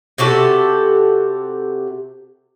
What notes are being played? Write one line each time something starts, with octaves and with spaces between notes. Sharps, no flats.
C3 F#4 G4 A4